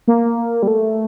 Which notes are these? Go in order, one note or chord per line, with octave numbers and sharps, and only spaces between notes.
A#3
G3
A3